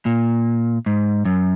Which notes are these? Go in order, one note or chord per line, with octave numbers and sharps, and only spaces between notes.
A#2
G#2
F#2